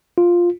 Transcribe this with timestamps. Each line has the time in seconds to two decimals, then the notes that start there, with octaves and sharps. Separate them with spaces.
0.18 F4